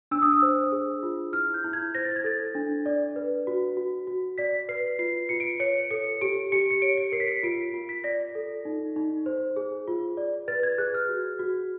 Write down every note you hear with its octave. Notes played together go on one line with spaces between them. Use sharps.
D4 E6
D#6
E6
C5
G#4
F4
E4 F6
G6
E4
G#6
C5 A#6
A6
G#6
A4 A6
D4
D5
B4
F#4
F#4
F#4
D5 B6
B4 C7
F4 C7
F4 C#7
D7
C#5 C#7
A4 C#7
G4 D7
G4 C#7
C#7
C#5 D7
C#7
A#4 C7
B6
C7
F4 D7
F4
B6
D5 A#6
A4
D#4
D#4
C5
G#4
F4
D5
B4 A6
G#6
G#4 F#6
F6
F#4
F#4